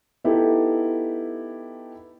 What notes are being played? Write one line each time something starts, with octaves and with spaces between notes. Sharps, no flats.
B3 D#4 E4 G4 A4